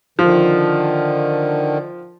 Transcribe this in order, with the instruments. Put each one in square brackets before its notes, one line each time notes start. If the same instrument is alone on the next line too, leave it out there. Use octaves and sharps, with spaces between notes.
[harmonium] D3 D#3 [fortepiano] F3